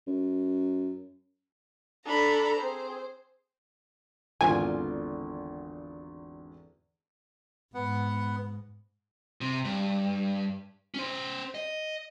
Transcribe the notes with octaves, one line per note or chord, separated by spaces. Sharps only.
F#2
D4 A4 A#5 B5
C4 G#4 C5
G#1 E2 D3 F4 G#5
G#2 B3 F#5
C3
G2
C#4 C5
D#5